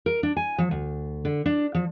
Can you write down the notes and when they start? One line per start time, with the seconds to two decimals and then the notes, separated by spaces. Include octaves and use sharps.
0.06 A#4
0.23 D4
0.37 G#5
0.58 F3
0.71 D2
1.25 D3
1.46 D4
1.75 F3